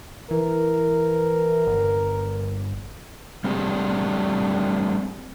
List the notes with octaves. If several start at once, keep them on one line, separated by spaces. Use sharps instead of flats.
E3 A#4
G1
G3 A3 C4 D4 G4 G#4